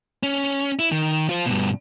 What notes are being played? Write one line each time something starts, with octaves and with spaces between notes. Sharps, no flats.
C#4
E4
D#3
F4 C5
G2 B2